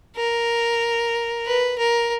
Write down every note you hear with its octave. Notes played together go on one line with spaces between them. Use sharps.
A#4
B4
A#4